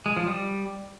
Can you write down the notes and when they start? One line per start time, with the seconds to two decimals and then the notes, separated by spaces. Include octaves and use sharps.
0.06 G#3
0.16 F3
0.27 G3